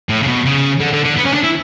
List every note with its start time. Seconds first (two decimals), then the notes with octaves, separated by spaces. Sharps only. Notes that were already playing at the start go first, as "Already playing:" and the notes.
0.09 A2
0.23 C#3
0.28 B2
0.45 C#3
0.80 D3
0.92 D3
1.04 D3
1.16 B3
1.25 C#4
1.33 D4
1.43 E4